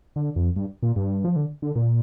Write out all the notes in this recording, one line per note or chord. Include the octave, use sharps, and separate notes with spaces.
D3
F2
G2
A#2
G2
F3
D3
D3
A#2